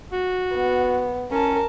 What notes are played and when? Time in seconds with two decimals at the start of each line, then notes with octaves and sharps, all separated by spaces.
0.12 F#4
0.55 B3
1.31 C#4 A#4 A5